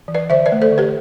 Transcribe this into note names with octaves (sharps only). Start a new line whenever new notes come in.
E3
B4 D5
D3 C5 E5
B4 D5
A3
A4 C5
D3
G4 B4